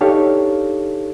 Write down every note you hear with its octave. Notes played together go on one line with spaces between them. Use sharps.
D4 D#4 G4 A4 C#5 F5